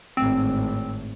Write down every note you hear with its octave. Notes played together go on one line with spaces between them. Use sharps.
G#1 A2 C4